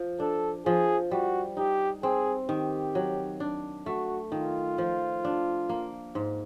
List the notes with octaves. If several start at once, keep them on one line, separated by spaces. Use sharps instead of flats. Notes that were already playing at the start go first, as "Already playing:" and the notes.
Already playing: F3
D4 A4
F3 G#4
G3 F#4
D#4 G4
C4 G#4
D#3 G4
F#3
D4
A3 F#4
D#3 F4
F3
D4
A#3
G#2